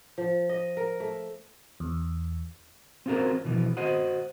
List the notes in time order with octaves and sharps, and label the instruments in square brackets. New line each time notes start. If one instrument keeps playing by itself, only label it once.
[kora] F3
D#5
A#4
A3
[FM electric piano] E2
[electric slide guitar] C4 C#4 F4 F#4 A#4 C5
B2 E3 F3
F#4 C5 D#5 F#5